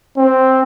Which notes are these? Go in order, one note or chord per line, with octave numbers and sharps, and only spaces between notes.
C4